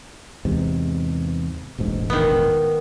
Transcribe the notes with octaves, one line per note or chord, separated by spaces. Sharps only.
E2 G#2 C3
E1 A1 G#2
D#3 B3